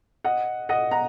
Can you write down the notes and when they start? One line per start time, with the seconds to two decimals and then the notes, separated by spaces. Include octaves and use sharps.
0.24 D#5 F#5
0.69 D#5 F#5
0.91 F#5 A#5